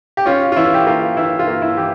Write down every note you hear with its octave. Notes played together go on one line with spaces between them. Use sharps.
G4
C#4 F4
F4
E3 E4
G4
A#3 F4
E3 E4
F4
A#3
E4
E3 G4